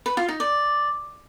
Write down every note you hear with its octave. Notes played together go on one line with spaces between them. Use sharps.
B4
F4
D#4
D5